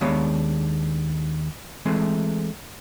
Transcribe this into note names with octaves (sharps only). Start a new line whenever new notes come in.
D#2 G#3 B3 D4 C#5 F5
E3 G#3 A3 C4